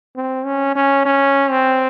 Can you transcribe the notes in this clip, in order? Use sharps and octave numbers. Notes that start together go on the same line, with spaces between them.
C4
C#4
C#4
C#4
C4